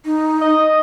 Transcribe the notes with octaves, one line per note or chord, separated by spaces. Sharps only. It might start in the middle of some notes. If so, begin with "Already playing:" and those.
D#4
D#5